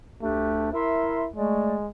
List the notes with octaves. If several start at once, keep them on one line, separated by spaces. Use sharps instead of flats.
D2 A3 D4 G4
E4 A#4 E5 C6
G#3 A3 D5